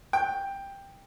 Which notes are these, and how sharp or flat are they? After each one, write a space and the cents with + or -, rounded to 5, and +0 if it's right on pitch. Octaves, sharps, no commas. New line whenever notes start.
G5 +10